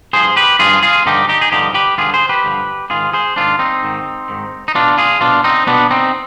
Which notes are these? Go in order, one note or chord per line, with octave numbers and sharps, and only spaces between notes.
G2 F3 G#4 C5
G4 B4
G2 F3 F4 G#4
F4 G#4
G2 D3 F3 D#4 G4
D#4 G4
G#4
G2 D3 F3 D#4 G4
G4 B4
G2 D3 F3 F4 G#4
G#4 C5
G4 B4
G2 D3 F3
G#2 D#3 F4 G#4
G#4 C5
G#2 D#3 D4 F4
C4 D#4
G#2 D#3
G#2 D#3
D#4
B2 D4 F4
F4 G#4
B2 D4 F4
C4 D#4
B2 B3 D4
C4 D#4